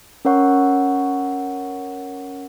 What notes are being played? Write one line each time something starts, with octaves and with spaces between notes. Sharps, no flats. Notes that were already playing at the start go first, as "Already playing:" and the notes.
C#4 A#4 C#5 F#5 C#6